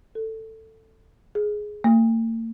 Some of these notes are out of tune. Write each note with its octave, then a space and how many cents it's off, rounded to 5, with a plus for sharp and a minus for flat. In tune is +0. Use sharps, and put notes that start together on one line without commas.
A4 +15
G#4 +10
A#3 -45